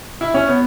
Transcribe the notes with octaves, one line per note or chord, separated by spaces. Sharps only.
E4
C#4
B3